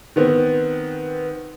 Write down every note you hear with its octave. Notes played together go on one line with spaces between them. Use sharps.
D#3 B3 C4